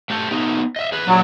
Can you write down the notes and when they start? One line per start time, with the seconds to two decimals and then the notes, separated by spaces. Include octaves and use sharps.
0.10 A3 G4 A4
0.31 A3 B3 D#4
0.76 D#5 E5
0.92 G#4 B4
1.07 A#2 F#3 D4